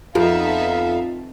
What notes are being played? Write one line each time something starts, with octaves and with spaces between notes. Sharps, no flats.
F2 F3 B3 D#4 E5 F5